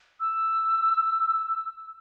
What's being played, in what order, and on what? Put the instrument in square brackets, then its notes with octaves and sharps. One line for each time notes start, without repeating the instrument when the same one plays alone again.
[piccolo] E6